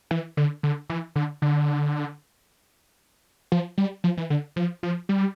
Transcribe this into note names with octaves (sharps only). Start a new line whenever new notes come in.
E3
D3
D3
E3
D3
D3
F3
G3
F3
E3
D3
F3
F3
G3